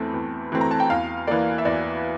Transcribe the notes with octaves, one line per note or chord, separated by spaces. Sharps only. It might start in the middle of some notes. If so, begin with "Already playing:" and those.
Already playing: E2 E3 A3 C4 A5
E2
E3 A3 C4
A#5
A5
G5
E2 F5
E3 A#3 D5
E5
E2 D5